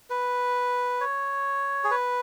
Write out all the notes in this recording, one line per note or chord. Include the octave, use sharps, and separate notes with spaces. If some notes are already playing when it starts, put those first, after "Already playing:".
B4
C#5
G#4
B4